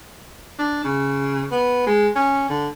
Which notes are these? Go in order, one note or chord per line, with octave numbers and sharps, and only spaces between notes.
D4
C#3
B3
G#3
C#4
D3